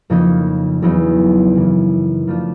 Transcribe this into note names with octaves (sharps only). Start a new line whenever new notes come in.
F2 C#3 F3 A#3 D#4
E2 C#3 F#3 B3 D#4
F#2 C#3 E3
C#3 F3 A3 D4 F4